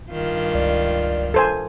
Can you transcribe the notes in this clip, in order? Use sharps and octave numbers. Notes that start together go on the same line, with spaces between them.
G2 D#3 F4
C#2 D5
A4 C5 G#5